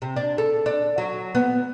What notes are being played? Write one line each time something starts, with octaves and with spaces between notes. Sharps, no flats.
C3
D4
A4
D4
F#3
B3